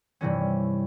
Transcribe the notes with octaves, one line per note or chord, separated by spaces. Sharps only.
G2 C3 E3 C#4